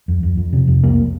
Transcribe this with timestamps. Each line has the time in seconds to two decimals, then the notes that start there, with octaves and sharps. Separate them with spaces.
0.08 F2
0.23 F2
0.37 F2
0.53 C3
0.68 F2
0.83 C2 A#3